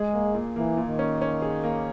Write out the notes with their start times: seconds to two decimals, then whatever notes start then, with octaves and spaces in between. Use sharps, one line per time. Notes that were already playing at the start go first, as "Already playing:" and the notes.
Already playing: G#3 G#4
0.14 A#3
0.34 A#2
0.56 E3 A#3
0.77 A#2
0.89 D#3
0.99 C#4
1.22 C#4
1.42 G#4
1.64 A#3